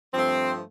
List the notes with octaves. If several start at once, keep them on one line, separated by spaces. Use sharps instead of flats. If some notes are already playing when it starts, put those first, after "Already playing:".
G2 F3 A3 C4